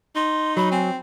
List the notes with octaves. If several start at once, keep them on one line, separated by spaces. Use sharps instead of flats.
D#4 C6
F#3 B5
C4 G#5